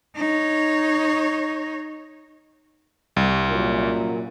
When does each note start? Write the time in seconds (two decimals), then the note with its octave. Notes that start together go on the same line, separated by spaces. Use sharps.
0.16 D#4 C#5
3.16 C2
3.50 F#2 A#2